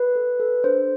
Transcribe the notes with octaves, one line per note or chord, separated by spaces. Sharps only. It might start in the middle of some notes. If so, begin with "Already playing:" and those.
Already playing: B4
A4
A4
D4 C5